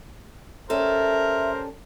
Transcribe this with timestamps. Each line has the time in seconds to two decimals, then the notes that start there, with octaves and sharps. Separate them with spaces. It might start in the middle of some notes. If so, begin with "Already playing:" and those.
0.70 G3 C#4 A4 A#4 C5 E5